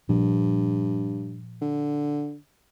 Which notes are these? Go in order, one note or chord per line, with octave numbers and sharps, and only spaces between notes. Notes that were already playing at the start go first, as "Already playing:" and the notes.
G2 A#2 F3
D3